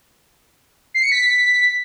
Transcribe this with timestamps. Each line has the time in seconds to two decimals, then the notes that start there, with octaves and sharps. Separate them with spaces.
0.94 C7
1.03 C#7
1.12 B6